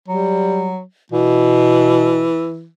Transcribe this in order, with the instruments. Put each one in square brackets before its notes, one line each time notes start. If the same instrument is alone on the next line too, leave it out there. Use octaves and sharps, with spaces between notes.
[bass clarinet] F#3 [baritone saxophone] G3
[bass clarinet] B2 [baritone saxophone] E3